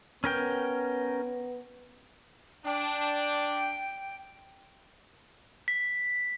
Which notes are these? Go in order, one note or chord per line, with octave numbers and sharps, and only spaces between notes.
B3 C#4 A#4 G5
D4 G5
B6